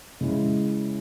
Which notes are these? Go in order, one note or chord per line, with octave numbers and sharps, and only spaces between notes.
C#3 G#3 C#4 E4